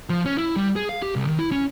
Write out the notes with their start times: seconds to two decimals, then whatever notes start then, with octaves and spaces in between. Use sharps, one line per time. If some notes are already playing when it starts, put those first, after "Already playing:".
0.10 F3
0.25 C#4
0.38 E4
0.56 G3
0.76 G#4
0.89 F5
1.02 G4
1.16 C2
1.27 D#3
1.39 E4
1.52 C#4